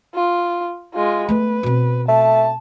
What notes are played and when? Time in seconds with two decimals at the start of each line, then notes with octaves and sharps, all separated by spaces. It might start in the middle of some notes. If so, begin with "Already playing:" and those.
0.15 F4
0.94 G#3 F4
1.29 A3 B3 B4
1.63 B2 C4
2.08 A3 A5